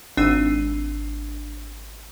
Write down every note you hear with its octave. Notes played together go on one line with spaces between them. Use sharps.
G#1 D4 E6 D#7